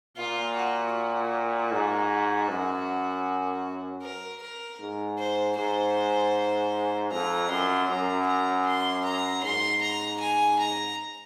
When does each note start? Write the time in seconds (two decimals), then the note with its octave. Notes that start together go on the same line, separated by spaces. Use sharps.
0.17 A#2 F4
0.56 F#4
0.94 F#4
1.72 G#2
2.49 F#2
4.02 A#4
4.42 A#4
4.80 G#2
5.19 C5
5.57 G#2 C5
7.12 F2 A#5
7.50 F#2 C6
7.89 F#2 A#5
8.27 A#5
8.66 C6
9.04 A#5
9.43 G#2 C6
9.81 A#5
10.20 G#5
10.59 A#5